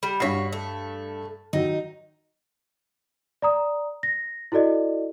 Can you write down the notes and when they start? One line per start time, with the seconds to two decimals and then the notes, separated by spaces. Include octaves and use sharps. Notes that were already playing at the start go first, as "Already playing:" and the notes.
0.03 G3
0.20 G2 F#4 C#5 B6 C7
0.53 A3
1.53 D#3 F#3 D#4
3.42 D5 A#5 D#6
4.03 A#6
4.52 E4 F#4 A4 D5 D#5